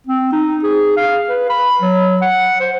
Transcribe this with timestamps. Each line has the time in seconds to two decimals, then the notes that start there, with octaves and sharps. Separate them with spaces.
0.07 C4
0.33 D#4
0.63 G#4
0.97 F5
1.29 B4
1.50 B5
1.82 F#3
2.21 F#5
2.60 C5